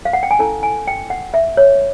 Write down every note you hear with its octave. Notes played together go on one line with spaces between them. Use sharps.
F5
F#5
G5
G#5
C#4 E4 A4 A5
G#5
G5
F#5
E5
C#5